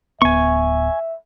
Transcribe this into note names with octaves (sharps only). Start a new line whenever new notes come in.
D1 B3 E5 G#5 C#6